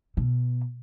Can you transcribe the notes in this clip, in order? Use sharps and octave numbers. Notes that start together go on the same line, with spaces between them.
B2